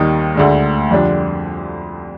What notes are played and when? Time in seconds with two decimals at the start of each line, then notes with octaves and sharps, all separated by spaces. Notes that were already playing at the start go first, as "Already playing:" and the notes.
Already playing: D#2 D#3 G3 A#3 D#4
0.35 D2 D3 G#3
0.90 F2 D3 G3 D4 G4